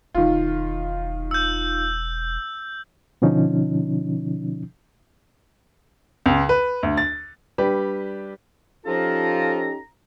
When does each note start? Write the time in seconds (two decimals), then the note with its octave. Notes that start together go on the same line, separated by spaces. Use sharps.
0.15 E1 D#3 F4
1.31 E6 G6
3.22 B2 D3 F3 C#4 D#4
6.26 C#2
6.49 B4
6.83 D2
6.97 A6
7.58 G3 D4 G4 B4
8.86 F3 C#4 D#4 F4 G4 A4 A#5